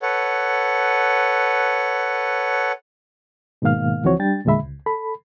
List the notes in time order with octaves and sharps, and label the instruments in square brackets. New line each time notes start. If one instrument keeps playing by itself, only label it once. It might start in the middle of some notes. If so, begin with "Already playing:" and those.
[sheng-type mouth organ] A4 B4 C#5 F#5
[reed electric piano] G#2 B2 D#3 A#3 F5 F6
C#2 E3 F3 C4 F#4 C#5
G3 D4 G5 A6
E2 A#2 D3 G#3 E5 B5
C#2
A4 B5